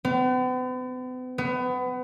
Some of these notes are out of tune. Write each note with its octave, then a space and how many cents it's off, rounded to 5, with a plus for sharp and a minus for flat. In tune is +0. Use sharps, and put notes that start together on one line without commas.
B3 +45
B3 +25